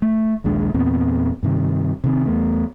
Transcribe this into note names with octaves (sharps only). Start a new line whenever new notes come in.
A3
A#1 D#2 G#3 D4
E2 A#2 B3 C4
G2 C3 D#3
C3 D#3 C4
E2 A3 B3